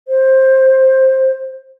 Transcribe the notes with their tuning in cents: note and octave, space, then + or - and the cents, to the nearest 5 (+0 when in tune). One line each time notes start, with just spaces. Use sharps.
C5 +15